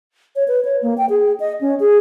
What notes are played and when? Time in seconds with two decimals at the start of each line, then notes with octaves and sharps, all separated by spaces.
0.36 C#5
0.48 B4
0.65 C#5
0.82 A#3
0.98 G5
1.10 G#4
1.40 D#5
1.61 C#4
1.80 G#4